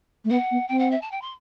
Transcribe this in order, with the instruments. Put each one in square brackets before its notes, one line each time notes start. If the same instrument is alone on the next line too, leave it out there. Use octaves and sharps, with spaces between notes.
[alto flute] A3
[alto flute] B3 [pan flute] F#5
[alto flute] B3
[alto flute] C4 [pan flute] G5
[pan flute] F#5
E5
A5
G5
C6